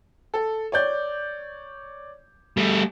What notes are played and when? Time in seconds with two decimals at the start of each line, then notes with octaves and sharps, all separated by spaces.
0.34 A4
0.72 C#5 D5 G6
2.57 G3 A3